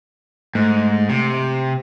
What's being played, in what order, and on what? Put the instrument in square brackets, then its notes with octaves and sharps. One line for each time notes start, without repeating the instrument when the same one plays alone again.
[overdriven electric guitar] G#2 [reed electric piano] A3
[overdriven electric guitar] C3